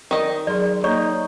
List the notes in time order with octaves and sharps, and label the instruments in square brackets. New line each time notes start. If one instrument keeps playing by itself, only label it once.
[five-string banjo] D#3 D#5 [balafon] D5
[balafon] F#3 G#4 C6 [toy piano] D5
[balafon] A#3 [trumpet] D#4 [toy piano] C#5 D5 C#6